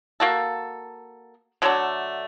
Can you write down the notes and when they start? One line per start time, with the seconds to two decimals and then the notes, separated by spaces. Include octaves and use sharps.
0.20 A#3 F#4 A4
1.62 D3 F#3 A3 D4